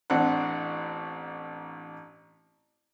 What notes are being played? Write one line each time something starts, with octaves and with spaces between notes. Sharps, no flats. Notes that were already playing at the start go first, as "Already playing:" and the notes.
A1 C4 D4 F#5